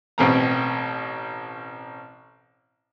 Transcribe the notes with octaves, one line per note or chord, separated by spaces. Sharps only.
A1 B2 C4 A#5